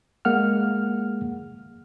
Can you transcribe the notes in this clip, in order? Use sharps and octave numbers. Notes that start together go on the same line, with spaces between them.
G#3 A#3 F#5 F6